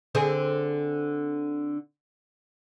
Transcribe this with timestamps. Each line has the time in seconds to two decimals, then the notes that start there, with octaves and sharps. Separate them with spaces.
0.15 D3 C4 G#4